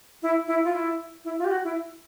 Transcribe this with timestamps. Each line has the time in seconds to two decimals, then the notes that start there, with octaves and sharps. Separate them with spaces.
0.22 E4
0.47 E4
0.64 F4
0.73 E4
1.25 E4
1.39 F4
1.45 G4
1.51 F#4
1.64 E4